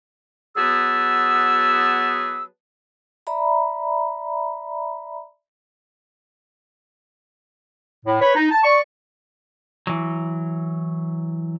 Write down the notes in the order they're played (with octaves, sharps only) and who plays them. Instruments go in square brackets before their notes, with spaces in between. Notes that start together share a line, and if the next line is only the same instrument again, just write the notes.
[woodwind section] F#3 B3 G#4 B4 A5 E6
[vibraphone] D5 E5 A#5 B5
[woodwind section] A2
B4 C#5 B5
D#4
A5
D5 C#6
[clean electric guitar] E3 F#3